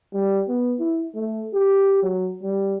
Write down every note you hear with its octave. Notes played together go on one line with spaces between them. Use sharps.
G3
B3
E4
A3
G4
F#3
G3